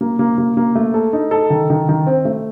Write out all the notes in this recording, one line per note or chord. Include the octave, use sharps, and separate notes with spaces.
A#3
A#3
A#3
A#3
A3
A4
D#4
A4
D#3
D#3
D#3
C4
A3